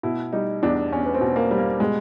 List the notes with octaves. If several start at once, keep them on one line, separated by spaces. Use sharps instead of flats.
B2 E4
G3 D#4
E2 D4
E2 C#4
B3
C4
B2
A#3
G3
A#3
B2 G#3